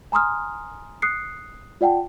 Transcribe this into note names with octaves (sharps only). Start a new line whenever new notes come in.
G#5 A#5 C6 D#6 F6
D#6 F#6 C7 C#7
F4 D5 F#5 G5 A5